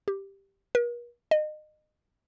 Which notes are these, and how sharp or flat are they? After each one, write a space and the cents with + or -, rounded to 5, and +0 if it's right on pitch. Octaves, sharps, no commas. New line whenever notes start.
G4 +0
A#4 +45
D#5 -30